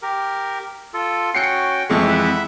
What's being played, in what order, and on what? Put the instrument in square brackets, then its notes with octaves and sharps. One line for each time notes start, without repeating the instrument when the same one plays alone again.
[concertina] G4 A#4
F4 A4
[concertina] C#4 F#4 G5 [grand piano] C7 C#7
[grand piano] F2 E3 G#3 [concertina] C#6
[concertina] E5 F#5 B5